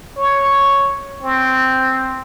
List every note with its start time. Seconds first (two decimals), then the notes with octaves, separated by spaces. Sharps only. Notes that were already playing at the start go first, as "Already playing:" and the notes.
0.17 C#5
1.23 C4